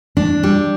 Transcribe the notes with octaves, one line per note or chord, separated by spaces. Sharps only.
D4
G3